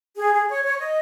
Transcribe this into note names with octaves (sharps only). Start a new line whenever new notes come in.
G#4
G#4
C#5
C#5
D#5